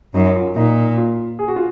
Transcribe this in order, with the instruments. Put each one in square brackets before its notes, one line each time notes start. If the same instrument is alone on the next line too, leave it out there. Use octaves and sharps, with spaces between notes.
[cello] F#2 [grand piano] D#4
[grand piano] F4
[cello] A#2 [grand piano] D#4
[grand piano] F4
G#4
F#4
F4